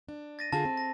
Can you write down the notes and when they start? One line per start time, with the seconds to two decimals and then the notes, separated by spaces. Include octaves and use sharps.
0.09 D4
0.39 A6 A#6 D#7
0.53 D3 F4 G#4 A5
0.65 C4
0.77 A#6